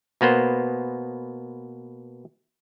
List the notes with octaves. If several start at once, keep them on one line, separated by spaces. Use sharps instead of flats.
B2 A#3 B3 C5